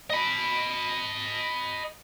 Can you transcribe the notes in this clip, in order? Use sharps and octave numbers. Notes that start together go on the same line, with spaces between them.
D#5 B5